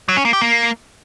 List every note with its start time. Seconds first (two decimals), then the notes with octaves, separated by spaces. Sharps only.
0.09 F#3
0.17 C#4
0.25 A#3
0.33 G4
0.41 A#3